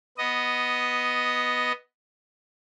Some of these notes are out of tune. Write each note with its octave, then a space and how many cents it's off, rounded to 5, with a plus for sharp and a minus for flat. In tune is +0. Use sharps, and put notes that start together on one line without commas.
B3 +0 D#5 +0